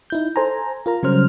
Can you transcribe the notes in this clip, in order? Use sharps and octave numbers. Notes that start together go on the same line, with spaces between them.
D#4 E4 G6
A4 C5 G#5 A#5
F4 A#4 A#5
C#3 F#3 G3 C#4 C5 F6